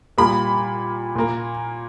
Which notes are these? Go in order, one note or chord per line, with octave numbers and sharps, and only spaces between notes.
A#2 G3 A#3 B5
A#2 A#3